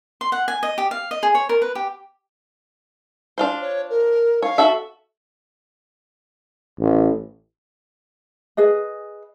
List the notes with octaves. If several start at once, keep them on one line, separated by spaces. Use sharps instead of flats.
C6
F#5
G#5
D#5
G4
F5
D#5
G#4
C#5
A#4
B4
G4
D4 F4 C5
C#5
A#4
C#5 F5
F#4 A4 E5
A1
G#4 B4 D#5